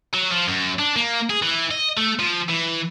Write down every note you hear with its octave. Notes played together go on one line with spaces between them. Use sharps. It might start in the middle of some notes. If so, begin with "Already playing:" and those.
F#3
F3
F#2
D4
A#3
G#4
E3
D#5
A3
F3
E3